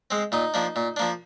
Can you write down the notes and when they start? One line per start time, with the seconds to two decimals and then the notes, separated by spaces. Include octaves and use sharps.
0.11 G#3 C4
0.32 A#2 D#4
0.54 F3 A#3 D4
0.76 A#2
0.96 F3 A#3 D4